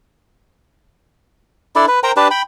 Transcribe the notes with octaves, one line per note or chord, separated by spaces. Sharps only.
D4 E4 A4 D5
B4
A#4 C5 G5 A#5
D4 G4 B4 A5
G5 B5